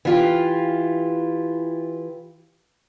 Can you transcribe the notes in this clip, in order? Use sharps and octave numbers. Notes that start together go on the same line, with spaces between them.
E3 F4 G4